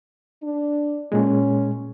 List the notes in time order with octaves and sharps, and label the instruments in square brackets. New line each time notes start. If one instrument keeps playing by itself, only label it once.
[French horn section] D4
[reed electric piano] A#2 G#3 [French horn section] C#4